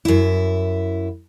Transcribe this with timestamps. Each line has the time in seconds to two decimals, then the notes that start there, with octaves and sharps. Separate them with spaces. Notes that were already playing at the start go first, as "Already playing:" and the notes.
0.05 F#2 E4